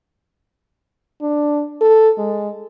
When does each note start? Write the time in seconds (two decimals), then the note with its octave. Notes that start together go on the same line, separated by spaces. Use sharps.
1.22 D4
1.81 A4
2.18 G#3